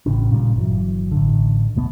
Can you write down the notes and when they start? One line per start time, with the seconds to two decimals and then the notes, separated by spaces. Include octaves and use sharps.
0.06 A1 C#3 C#4
0.32 A#2 C#3 G3
0.56 G1 E3 F#3
1.11 A1 D3
1.76 D#1 B2 A3 B3